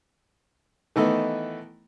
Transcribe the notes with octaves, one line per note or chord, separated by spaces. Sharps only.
D#3 E3 A3 B3 D#4